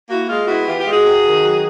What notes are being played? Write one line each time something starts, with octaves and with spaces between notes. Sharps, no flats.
A#3 E4 F#4
G#3 F4
B3 E4 F#4
E3 F4 G4
F4 G4
G#3
F#4 G#4
C3
D#3
F#3